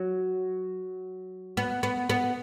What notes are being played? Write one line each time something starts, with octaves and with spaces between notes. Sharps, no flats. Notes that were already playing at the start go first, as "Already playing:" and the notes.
Already playing: F#3
B3
B3
B3